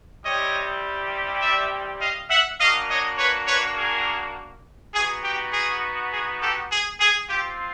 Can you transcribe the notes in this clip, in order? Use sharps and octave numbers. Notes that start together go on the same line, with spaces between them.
G3 C4 E4 G4 C#5 D#5
D5 E5
D#5 F5
E5 F#5
A#3 D4 F#4 D#5 F5
C#5 D#5
B4 C#5
B4 C#5
G#4 A#4
B3 D#4 F#4 G#4
G4
G#4
G#4
G4 A4
G#4
G#4
C4 F4 G4